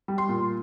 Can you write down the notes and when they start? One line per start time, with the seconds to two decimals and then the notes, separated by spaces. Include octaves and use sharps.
0.08 G3
0.18 C6
0.29 A#2